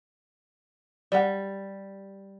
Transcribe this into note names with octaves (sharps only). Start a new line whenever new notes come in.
G3 D5 F#5